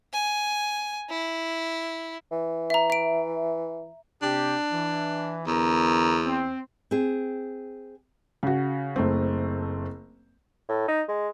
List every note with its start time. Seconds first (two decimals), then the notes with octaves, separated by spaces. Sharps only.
0.13 G#5
1.10 E4
2.32 E3
2.70 E5 A#5
2.90 E5 D7
4.22 C3 D4 G4
4.71 E3
5.46 E2 D3 A#4 A#5
6.25 C4
6.91 C4 G#4
8.43 C#3 F#4
8.96 F#1 A3 C4
10.69 A2
10.88 D#4
11.08 G#3